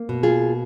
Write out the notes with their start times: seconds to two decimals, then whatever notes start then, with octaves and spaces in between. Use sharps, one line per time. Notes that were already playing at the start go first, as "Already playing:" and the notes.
Already playing: A#3
0.09 B2
0.23 F4 G#4